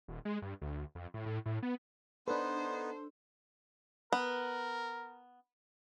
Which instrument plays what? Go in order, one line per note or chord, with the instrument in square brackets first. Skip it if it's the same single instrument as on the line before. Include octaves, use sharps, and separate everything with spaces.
[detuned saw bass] D#1
G#3
G2
D2
F2
A2
A2
A2
B3
[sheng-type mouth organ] B3 D#4 [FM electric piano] D4 A4 [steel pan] B4 [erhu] C5
[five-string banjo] B3 [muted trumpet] A#4